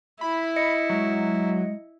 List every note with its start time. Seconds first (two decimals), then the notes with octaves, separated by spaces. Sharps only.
0.21 E4 B5
0.56 D#5 C#7
0.89 F#3 G#3